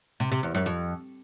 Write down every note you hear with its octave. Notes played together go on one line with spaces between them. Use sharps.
C3
C3
E2
F#2
F2